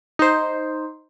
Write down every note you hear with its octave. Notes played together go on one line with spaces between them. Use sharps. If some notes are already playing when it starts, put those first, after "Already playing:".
D#4 C5